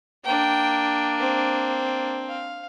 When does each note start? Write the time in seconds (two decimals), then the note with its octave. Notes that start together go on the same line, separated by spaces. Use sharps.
0.25 A#3 D4 G5
1.20 C4
2.28 F5